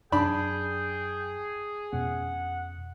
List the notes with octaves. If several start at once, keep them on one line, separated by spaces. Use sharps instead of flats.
F#2 D4 G#4 G5 B5
F2 B2 C#4 F#5